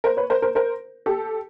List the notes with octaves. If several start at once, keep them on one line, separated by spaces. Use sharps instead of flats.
A#4 C5
B4 C#5
A#4 C5
A#4 C5
A#4 C5
G4 A4